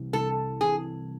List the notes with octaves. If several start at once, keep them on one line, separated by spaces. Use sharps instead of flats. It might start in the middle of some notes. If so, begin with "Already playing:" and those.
Already playing: C2 C3 E3
C2 A4
C3 E3 G#4